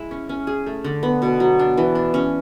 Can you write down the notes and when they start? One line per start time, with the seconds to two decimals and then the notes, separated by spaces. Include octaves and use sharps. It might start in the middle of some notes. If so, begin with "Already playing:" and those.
Already playing: G#3 E4
0.11 C#4
0.29 C#4
0.47 G#4
0.66 A3
0.84 D3
1.03 B3
1.22 B2
1.40 F#3
1.59 D4
1.77 E3
1.95 D4
2.14 C#4